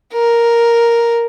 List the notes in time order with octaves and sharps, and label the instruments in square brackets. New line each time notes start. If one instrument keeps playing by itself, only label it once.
[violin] A#4